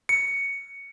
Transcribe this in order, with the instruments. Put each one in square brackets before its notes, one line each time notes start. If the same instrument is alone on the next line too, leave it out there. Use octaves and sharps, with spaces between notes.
[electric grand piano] C#7